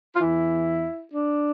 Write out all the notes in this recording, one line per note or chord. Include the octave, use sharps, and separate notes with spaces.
F4
E2 E3 E4
D4